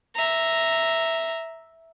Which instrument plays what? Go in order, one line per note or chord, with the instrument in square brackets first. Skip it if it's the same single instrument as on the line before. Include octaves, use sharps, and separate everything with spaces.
[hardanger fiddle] E5 A#5